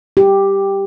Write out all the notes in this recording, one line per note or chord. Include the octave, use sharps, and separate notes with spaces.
G4